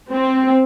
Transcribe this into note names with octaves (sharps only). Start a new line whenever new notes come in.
C4